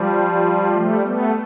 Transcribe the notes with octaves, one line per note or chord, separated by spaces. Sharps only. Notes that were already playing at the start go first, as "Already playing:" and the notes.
Already playing: F3 G3
G3 A3
A3 B3